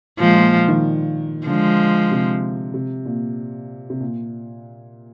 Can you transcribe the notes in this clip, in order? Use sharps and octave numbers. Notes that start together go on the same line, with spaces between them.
A#2 F3 G#3
A#2
D#3
D3 F3 G#3
C3
C3
A#2
C3
A#2